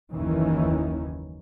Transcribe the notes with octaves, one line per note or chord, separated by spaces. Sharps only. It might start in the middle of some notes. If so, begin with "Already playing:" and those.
F#1 D#2 D#3 E3 C#4